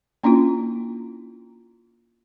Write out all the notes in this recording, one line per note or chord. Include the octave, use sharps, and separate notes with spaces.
A#3 C#4 D4 E4 F4